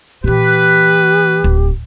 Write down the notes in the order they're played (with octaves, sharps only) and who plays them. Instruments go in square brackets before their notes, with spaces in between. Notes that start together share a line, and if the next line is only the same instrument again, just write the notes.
[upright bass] A#2 E3 [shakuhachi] G4 [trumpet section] B4
[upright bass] D1